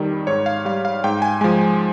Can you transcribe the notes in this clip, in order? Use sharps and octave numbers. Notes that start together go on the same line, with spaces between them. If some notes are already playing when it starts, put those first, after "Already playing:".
Already playing: F2 D#3 G3
G#2 C#5
F5
G3 F5
F5
G#2 G5
G#5
F3 G#3 G#5